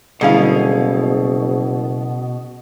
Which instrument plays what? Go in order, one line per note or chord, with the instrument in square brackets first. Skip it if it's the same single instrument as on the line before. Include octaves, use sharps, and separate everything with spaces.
[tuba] F#1 [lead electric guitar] B2 [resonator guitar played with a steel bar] D3 G#4 F5 [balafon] G3 C#4 E4